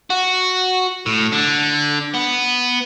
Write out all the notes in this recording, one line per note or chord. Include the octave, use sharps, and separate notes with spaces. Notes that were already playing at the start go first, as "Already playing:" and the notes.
F#4
A2
D3
B3